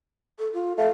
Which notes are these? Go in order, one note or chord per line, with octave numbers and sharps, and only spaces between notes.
A4
F4
A3 F5